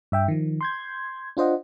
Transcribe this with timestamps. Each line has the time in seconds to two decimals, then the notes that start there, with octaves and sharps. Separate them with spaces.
0.12 G2 E5 G5
0.28 D#3 F3
0.61 C6 G6 G#6
1.37 D4 F4 C5 D#5 F#5